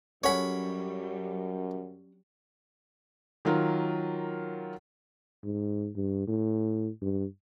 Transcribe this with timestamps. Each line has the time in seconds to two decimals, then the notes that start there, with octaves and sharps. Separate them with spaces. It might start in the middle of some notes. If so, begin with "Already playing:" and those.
0.24 F#2 F#3 G3 C#4 A4 C#5 F#5 B5
3.45 D#3 F#3 F4 A#4
5.44 G#2
5.96 G2
6.28 A2
7.02 G2